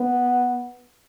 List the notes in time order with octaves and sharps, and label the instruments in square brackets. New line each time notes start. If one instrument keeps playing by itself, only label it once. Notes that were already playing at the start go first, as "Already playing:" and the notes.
Already playing: [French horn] B3